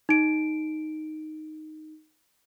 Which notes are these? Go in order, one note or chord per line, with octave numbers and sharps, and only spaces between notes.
D#4 D7